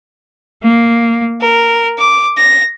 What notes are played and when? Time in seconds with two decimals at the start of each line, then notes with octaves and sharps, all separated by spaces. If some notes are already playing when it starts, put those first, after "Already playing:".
0.64 A#3
1.41 A#4
1.98 D6
2.37 A#6